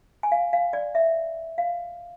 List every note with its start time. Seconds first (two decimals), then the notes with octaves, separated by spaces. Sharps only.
0.23 G#5
0.32 F5
0.53 F5
0.73 D5
0.95 E5
1.58 F5